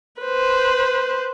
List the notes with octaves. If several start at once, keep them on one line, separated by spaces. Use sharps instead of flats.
B4 C5